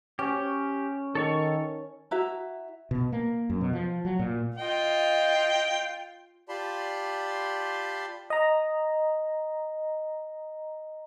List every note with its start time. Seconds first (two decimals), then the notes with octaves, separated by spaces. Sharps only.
0.19 C#4 G4
1.15 D#3 A4 C#5 C#6
2.11 E4 F#4 E5 A#5
2.91 B2
3.12 A#3
3.50 F#2
3.61 B2
3.73 F3
4.05 F#3
4.19 A#2
4.58 F4 D#5 F5 G5
6.49 F4 G4 D5 A5 B5 C6
8.30 D#5 A#5